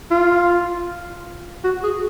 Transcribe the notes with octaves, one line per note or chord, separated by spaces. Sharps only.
F4
F#4
G#4